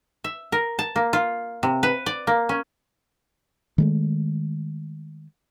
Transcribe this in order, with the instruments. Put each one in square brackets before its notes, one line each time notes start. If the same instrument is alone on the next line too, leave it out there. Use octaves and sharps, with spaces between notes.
[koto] E5
A#4
A5
A#3
F4
C3
B4
D5
A#3
C#4
[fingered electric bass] D#3 G#3 A3